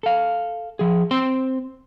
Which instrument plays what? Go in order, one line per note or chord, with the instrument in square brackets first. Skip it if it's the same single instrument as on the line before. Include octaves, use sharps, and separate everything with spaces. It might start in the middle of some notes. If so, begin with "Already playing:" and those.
[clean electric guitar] A4 F5
F3 G#4
C4 C5 C6